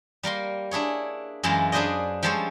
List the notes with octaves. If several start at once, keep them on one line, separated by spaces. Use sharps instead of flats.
G3 A#3 A#4 C6
D4 E4 G#4 C#5
F#2 E3 G#3 E4 F4 A#4
D4 G#4 B4 C5 D5 D#5
F3 G3 G#3 A4 C5 C#5